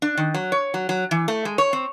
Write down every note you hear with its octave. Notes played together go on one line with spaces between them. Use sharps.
D4
D#3
F#3
C#5
F#3
F#3
E3
A3
G#3
C#5
C4